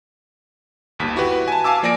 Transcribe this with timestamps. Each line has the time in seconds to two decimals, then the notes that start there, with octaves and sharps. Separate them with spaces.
0.99 G1 D#2 B6
1.16 E4 F#4 G4 B4
1.48 G#5 A5
1.64 F5 G#5 A5 D6 E6
1.83 F3 A#3 D5 G#5 A#6 D7